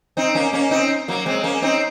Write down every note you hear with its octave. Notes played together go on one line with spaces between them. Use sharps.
C4 D#4
A#3 C#4
A#3 C#4
C4 D#4
F#3 A#3
G#3 C4
A#3 C#4
C4 D#4